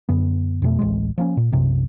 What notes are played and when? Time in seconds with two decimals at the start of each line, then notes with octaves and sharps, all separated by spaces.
0.09 F#2 D3 B3
0.62 F2 B2 A3
0.79 D1 A1 A#2 G#3
1.18 F3 A#3 C#4
1.37 A#2
1.52 B1 F#2 C3